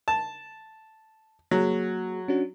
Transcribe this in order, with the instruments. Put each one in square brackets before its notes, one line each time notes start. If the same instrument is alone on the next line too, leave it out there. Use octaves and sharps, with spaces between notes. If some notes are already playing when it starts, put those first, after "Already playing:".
[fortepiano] A5
[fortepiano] F#3 [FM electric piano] A#3 F#4 G#4
[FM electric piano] C#4 D4 F#4